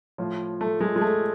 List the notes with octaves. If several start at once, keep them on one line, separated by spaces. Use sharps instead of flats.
A2 F3
A3
G#3
G#3
A3